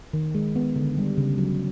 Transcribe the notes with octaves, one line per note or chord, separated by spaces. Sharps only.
D#3
G#3
B3
D3
G3
C#3
F#3